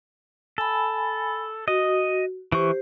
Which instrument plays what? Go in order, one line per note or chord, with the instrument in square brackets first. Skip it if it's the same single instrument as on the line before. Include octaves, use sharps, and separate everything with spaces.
[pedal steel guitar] A4 [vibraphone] G#5 B5
[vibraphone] F#4 [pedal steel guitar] D#5
[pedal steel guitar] E3 C#6 [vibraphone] G4 C5